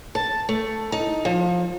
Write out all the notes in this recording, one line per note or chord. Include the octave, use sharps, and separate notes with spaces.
A5
A3
D#4
F3